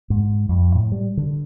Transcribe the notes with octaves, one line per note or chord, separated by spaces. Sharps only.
G#2
F2
A2
G3
D3